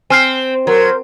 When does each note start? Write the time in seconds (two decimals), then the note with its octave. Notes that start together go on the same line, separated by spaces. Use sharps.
0.10 C4 G#5 F6 C7
0.67 F#3 A#4 C5